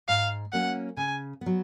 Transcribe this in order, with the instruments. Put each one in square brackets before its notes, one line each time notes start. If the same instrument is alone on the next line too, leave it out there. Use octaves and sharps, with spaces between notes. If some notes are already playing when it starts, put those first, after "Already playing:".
[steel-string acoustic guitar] G#2 [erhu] F5
[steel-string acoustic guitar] F#3 A#3 C#4 [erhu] F#5
[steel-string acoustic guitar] C#3 [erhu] G#5
[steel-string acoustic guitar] B3
F#3